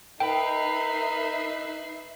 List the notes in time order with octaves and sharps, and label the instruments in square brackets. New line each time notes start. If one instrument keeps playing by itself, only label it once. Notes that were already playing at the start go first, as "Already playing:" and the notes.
[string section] D#4 E5 C7 [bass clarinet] A#4 [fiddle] B4 [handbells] G5